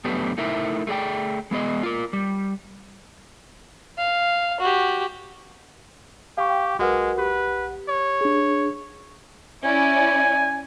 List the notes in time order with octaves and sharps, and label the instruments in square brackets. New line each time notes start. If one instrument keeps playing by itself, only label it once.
[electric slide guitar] F#2 A3 B3 D4 G4 B4
A3 D#4 E4 A#4 E5
A3 G#4 D5 G5
G#3 B3 G#4 D#5
F4 A#4
G3
[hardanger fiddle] F5
F#4 G4
[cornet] G4 [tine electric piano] F5 G5 C#6
[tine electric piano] B1 F#5 [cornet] G#3 [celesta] F#4 A#4 B4
[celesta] G4 [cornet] B4
[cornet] C#5
[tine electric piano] D4 G#4
[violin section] C#4 E4 D5 [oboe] G#5